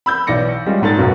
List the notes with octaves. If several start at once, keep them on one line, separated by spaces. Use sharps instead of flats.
B5 E6 G6
B1 E3 D5 A#6 C#7
G3 G#3 C#4 F4
A#1 G#2 A4 A6
B1 F#2 B3 F#4